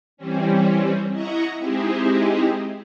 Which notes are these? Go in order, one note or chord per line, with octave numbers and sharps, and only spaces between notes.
E3 G3 C4 C#4
E4 D#5 F#5 A#5 C#6
G#3 C4 D#4 E4 G4 G#4